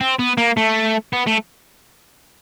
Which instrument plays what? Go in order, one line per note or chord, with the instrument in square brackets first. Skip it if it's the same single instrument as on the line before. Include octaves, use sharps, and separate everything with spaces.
[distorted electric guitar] C4
B3
A#3
A3
B3
A3